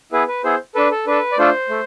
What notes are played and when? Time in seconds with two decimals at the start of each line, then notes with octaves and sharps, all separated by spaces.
0.12 B3 E4 G#4 B4
0.28 B4
0.44 B3 E4 G#4 C5
0.75 D4 A4 B4
0.91 A4
1.07 D4 A4 B4
1.32 D5
1.38 A3 D4 F4 A4 C5
1.69 A3